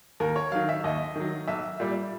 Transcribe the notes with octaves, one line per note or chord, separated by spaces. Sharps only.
D#2 A#4
C#5
D#3 F#3 F5
E5
D#2 D#5
D#3 F#3
B1 E5
A#2 G3